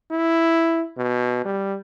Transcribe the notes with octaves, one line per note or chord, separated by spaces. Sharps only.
E4
B2
G3